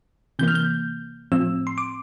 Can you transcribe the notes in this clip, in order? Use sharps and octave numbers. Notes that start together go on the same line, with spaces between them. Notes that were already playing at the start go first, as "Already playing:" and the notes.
C3 E3 A#3 G6
F6
G6
A2 F3 C4 E6
C6
D6